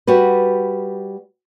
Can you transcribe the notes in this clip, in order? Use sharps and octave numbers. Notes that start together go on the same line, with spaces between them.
G3 F#4 B4